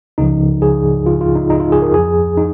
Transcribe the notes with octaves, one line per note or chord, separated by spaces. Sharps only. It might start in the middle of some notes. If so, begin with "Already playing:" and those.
C#2 C#3 F3 D#4
G#4
F4
F4
D#4
D#4
F4
G#4
A#4
F2 F3 G#4
D#4